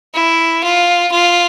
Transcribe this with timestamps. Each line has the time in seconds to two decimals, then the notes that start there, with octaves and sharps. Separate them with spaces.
0.14 E4
0.63 F4
1.11 F4